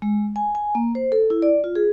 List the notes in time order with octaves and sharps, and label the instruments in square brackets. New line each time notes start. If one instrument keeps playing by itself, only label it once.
[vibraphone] G#3
G#5
G#5
A#3
C5
A4
E4
D5
F4
G#4